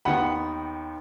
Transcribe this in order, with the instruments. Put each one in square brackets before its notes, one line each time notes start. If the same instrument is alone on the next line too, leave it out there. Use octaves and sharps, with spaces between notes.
[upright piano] D#2 D#3 B3 F#5 B5